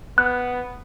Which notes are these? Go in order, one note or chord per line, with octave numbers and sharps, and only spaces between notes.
B3 F#6